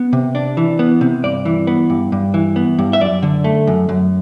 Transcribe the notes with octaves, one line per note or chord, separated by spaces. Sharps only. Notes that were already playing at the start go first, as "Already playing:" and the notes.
Already playing: B3
C3
D4
E3
B3
C3
G2 D5
E3
B3
G2
G2
E3
B3
G2
E5
F#2 D5
D3
A3
F#2
F#2